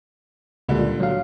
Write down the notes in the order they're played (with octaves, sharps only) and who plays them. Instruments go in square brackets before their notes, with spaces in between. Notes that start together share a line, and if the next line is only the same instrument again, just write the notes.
[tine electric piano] C#2 [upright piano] A#2 D3 G3
[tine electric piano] F#3 F5